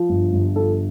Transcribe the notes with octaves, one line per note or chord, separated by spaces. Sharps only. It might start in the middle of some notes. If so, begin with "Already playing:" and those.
Already playing: F3
G1
G1
F3 A4